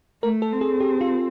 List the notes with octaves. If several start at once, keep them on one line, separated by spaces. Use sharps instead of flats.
A3 A#4
A4
C4
G#4
G4
F4